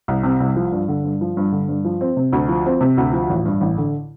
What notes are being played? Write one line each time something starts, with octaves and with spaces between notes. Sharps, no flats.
C2
C3
C2
F3
G2
D3
G2
F3
G2
D3
G2
F3
C4
C3
D2
F3
C4
C3
D2
F3
A1
G2
A1
D3